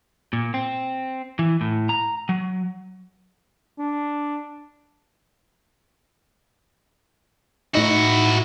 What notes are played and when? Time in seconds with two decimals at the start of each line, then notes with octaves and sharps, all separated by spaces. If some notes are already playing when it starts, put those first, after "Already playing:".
0.33 A#2
0.54 C4
1.39 E3
1.61 A2
1.89 A#5
2.29 F#3
3.79 D4
7.75 A2 D#4 E4 F#4